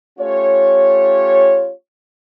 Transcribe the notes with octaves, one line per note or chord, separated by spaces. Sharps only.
A3 C#4 F4 G4 C#5